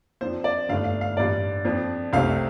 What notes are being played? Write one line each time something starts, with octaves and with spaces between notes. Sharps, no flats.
F2 F3 D4 C5
D5
G1 G2 D3 A3 D4 F5
F5
F5
A1 G2 G3 D5
F2 F3 D4
C2 C3 A3 C4 F5